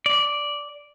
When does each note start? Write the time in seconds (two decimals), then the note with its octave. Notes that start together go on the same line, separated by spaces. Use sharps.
0.06 D5